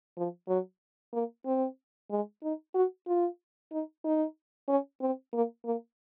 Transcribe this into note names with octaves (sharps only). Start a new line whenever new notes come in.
F3
F#3
A#3
C4
G#3
D#4
F#4
F4
D#4
D#4
C#4
C4
A#3
A#3